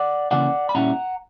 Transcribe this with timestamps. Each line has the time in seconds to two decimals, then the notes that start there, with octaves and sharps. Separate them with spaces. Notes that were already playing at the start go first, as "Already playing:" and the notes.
Already playing: D5 F#5
0.31 C#3 E3 A#3 C#4 D5 F#5
0.69 B5
0.75 A#2 G3 C#4 E4 F#5 A#5